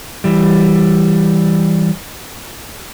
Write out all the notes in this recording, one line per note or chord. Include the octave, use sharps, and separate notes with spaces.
E3 G3